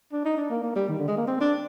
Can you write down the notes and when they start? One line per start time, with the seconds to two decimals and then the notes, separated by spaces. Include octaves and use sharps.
0.13 D4
0.25 D#4
0.37 D4
0.50 A#3
0.63 A#3
0.76 G3
0.89 D#3
0.99 D3
1.08 G#3
1.17 A#3
1.28 C4
1.41 D4